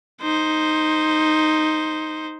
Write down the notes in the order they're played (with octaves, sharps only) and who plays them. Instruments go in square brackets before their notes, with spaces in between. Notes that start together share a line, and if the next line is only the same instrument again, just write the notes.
[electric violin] D#4 C5